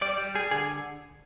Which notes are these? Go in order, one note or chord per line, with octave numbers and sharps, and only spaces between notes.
G3 D5
G3
G3 G#4
D3 G#4